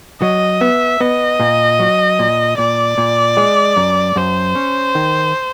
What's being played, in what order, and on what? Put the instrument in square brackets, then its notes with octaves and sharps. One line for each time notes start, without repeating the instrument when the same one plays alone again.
[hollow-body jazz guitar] F#3 [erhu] D#5
[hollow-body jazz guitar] B3 [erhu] E5
[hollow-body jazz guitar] B3 [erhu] D#5
[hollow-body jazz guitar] A#2
F#3
A#2
[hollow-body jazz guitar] A#2 [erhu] D5
[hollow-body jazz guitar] A#2
G#3
F#2
[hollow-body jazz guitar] F#2 [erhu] C5
[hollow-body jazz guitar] C#4
D#3